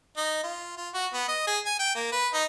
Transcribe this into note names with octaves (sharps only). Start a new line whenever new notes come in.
D#4
F4
F4
F#4
B3
D#5
G#4
G#5
G5
A#3
B4
D#4